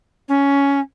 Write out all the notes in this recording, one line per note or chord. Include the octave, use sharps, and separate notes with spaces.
C#4